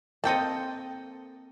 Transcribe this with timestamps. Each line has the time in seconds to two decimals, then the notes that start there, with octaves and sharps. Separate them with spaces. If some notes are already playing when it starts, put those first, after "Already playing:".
0.24 A#3 C4 A4 D#5 G5 A5